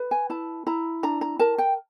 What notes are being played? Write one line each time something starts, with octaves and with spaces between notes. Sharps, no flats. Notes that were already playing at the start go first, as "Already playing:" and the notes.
Already playing: B4
G#5
E4 A5
E4 A#5
D4 A#5
A#5
A#4 A5
G5